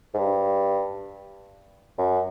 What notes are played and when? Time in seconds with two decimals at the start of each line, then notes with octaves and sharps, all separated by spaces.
0.14 G#2
0.19 G2
1.98 F#2